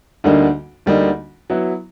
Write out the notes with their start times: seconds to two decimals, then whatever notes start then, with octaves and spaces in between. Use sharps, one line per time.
0.24 D2 D3 G3 A#3 D#4
0.86 D2 D3 G3 A#3 D#4
1.50 F#3 B3 E4